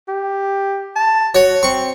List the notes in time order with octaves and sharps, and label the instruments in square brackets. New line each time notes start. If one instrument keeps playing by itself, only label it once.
[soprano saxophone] G4
A5
[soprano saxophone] F#4 [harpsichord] C#5
[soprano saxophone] C4 [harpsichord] C#6